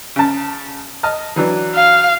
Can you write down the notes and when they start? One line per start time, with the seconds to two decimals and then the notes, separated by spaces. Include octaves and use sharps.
0.16 C#3 A5
1.03 D#5 A5 F6
1.36 E3 F#3 D4
1.75 F5